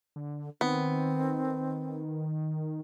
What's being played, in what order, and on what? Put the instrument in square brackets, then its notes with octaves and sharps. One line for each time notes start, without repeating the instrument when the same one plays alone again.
[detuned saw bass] D3
[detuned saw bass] D#3 [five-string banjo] B3 [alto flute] C4